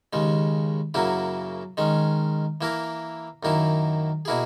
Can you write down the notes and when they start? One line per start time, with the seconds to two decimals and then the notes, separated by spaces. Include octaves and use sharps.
0.13 D#2 C#3 G#3
0.94 F#2 C#3 F#3 A#3 E4
1.77 D#3 G#3 C#4
2.61 E3 A#3 E4 A#4
3.43 F#2 D#3 A#3 E4
4.25 B2 A#3 E4 G#4